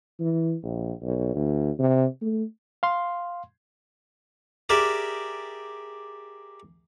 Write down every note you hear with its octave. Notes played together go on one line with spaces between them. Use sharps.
E3
A#1
B1
D2
C3
A3
F5 C6
G4 G#4 A#4 D5 E5